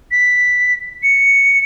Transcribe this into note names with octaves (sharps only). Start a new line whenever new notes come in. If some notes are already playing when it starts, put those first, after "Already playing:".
B6
C#7